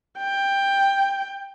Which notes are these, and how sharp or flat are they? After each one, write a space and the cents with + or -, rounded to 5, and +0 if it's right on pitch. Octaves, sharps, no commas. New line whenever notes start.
G5 +10